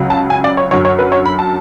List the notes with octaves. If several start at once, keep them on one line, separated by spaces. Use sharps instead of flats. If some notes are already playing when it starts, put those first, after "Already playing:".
Already playing: C#2 C#3 F#3
A5
G#5
D5
C#5
F#2 D3 F#3 C#5
C#5
B4
C#5
B5
A5